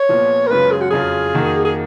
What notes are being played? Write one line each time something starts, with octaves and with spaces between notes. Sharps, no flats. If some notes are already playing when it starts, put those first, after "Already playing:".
Already playing: C#5
A#1 A#2 F3 B3
A#4
F#2 C#3 G#3 C#4 F4 B4
G#4
F#4
F2 C#3 F#3 C#4 F4 G#4
F2 D#3 A#3 D#4 F#4
G#4